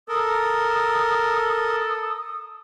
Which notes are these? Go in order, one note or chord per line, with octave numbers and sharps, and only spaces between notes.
A4 A#4 D#6